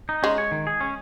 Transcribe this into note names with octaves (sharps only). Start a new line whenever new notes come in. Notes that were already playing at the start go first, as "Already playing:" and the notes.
D#4
G#3 C#4
C#5
D#3
G#4
C#4